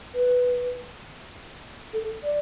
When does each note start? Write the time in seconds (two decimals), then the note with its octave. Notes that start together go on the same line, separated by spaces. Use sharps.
0.14 B4
1.93 A4
2.23 D5